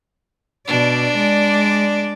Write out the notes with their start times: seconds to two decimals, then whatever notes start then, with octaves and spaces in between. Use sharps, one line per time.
0.67 B2 D4 D5
1.16 G#3 D5